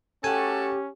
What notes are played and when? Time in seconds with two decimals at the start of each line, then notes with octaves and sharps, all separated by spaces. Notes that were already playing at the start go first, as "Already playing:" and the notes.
0.24 A3 C#4 F#4 G4 A4 G#5